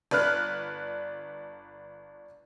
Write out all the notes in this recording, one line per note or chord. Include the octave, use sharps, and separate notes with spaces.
G1 D4 B4 F6 F#6